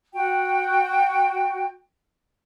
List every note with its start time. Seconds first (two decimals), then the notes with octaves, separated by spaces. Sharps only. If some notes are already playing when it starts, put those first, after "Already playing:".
0.13 F#4 G5